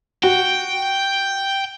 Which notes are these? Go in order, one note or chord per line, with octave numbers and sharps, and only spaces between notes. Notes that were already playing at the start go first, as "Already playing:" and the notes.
F#4 G5